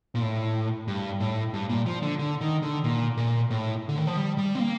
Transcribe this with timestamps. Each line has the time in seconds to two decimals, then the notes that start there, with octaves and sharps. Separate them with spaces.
0.15 A#2
0.22 A2
0.88 G2
1.20 A2
1.54 G2
1.69 A#2
1.86 F3
2.03 D3
2.19 D3
2.41 D#3
2.63 D3
2.84 A#2
3.17 A#2
3.51 A2
3.89 D3
3.98 D#3
4.07 F3
4.16 G3
4.38 G3
4.55 C4
4.60 A#3